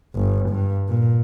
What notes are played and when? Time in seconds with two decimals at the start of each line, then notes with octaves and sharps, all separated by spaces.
0.16 G1
0.50 G2
0.88 A#2